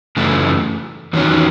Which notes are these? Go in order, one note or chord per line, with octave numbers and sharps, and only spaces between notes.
F#2 C#3 E3 A3
E2 D#3 F#3 C#4